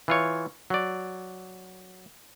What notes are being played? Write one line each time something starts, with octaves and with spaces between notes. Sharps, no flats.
E3 F4 C#5
F#3 D5